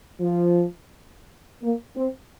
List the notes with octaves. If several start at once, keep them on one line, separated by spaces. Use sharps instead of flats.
F3
A#3
C4